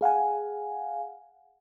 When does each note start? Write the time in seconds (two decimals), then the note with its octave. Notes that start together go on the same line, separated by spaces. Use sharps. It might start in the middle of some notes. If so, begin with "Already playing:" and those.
0.01 G#4 F5 F#5 G#5